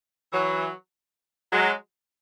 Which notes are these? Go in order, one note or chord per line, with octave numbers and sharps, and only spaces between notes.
E3 F#3
F#3 G#3